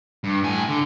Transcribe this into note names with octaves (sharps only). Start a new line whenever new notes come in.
G2
A2 G#5
D3